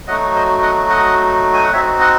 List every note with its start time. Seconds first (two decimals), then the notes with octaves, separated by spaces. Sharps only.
0.07 F#3 A3 D#4 F#4 D#5 F#5
0.35 C5 D#5
0.62 D#5 F#5
0.90 D#5 F#5
1.53 G#5
1.63 F#5
1.72 C4 D#4 F#4 C#5 E5
2.00 D#5 F#5